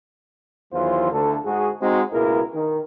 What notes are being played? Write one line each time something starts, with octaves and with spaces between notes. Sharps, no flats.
E2 D#3 E3 F#3 F4 C5
D2 A4
G#2 F#4 G#4
G#3 C4 D#4 F#4
C#2 B2 A#3 E4 G#4 A#4
D#3